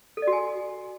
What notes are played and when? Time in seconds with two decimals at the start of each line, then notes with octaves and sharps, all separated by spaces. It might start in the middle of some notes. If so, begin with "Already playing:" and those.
0.17 A4
0.22 D5
0.27 F#4
0.33 G#5